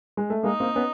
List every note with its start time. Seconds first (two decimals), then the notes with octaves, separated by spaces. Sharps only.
0.17 G#3
0.30 A3
0.43 G#3 A#3 D#4
0.60 A#3 C4
0.75 B3 C#4